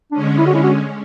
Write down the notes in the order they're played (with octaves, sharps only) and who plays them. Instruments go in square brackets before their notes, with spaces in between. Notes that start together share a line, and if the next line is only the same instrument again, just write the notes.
[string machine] D3 G#3 C#4 [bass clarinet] D4
[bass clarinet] E4
F#4
E4
F#4